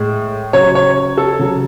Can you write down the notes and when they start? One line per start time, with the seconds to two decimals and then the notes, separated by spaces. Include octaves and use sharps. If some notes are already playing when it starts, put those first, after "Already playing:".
Already playing: A2 G#3
0.53 C#3 F#3 C#5
0.75 C#5
1.18 A4
1.39 C#3 F#3